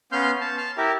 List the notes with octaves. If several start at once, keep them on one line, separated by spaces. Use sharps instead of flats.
B3 C#4 F5 C6 F6 G6
A5
A5 F6
E4 G4 A#4 E5